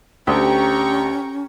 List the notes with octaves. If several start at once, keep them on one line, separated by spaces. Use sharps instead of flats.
D2 C#4 G4 G5 A#5 C#6